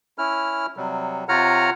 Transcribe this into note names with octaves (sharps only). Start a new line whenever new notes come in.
C#4 E4 F6
C3 F#3 G3
C3 F4 C#5 F#5 A#5 F6